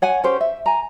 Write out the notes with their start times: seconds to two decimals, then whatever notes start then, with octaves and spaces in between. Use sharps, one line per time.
0.02 C#5 F#5 G#5
0.24 C#4 G4 C5
0.41 E5
0.66 G#5 A#5